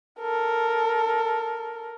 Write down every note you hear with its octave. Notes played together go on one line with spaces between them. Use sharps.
A4 A#4